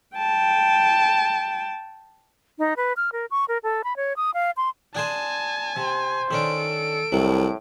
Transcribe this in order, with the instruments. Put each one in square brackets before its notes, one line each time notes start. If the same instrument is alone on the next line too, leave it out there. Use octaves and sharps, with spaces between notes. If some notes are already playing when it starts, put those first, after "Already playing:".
[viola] G5 A5
[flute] D#4
B4
F6
A#4
C#6
A#4
A4
B5
C#5
D#6
F5
C6
[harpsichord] D4 G#4 C5 [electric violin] G#5 A5
[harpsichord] C3 [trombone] C5
[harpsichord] D#3 C#4 D4 [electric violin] A4 D7
[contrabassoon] C2 [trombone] A2 [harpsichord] F#3